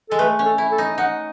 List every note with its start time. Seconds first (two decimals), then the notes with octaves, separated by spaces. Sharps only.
0.10 G#3 A4
0.19 A3 B4
0.39 C#4
0.45 A4
0.58 E4
0.72 A4
0.78 D#4
0.98 D#4 F#5